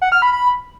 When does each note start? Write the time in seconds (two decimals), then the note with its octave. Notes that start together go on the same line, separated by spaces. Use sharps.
0.02 F#5
0.12 F6
0.22 B5
0.32 B5